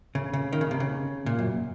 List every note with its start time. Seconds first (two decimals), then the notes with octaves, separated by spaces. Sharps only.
0.15 C#3
0.33 C#3
0.53 D#3
0.61 C#3
0.71 C3
0.80 C#3
1.26 A#2
1.39 F#2